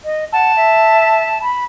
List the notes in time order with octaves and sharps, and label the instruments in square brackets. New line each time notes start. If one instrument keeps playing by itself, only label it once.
[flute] D#5
[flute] F#5 [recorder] A5
[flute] E5
B5